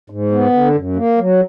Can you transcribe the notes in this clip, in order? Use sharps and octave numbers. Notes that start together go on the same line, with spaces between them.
G#2
B3
D3
F#2
A#3
F#3